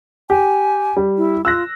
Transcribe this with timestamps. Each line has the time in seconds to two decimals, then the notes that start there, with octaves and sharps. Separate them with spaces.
0.30 G4 G#5
0.97 G3
1.17 E4
1.45 F4 E6 F#6 A#6